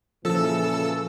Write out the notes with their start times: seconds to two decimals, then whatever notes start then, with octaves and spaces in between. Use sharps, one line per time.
0.25 A#2 C#3 E3 F3 A4 E6